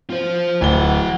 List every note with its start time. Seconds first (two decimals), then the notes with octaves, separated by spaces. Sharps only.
0.10 F4 C5
0.61 D1 E3 F#5 G7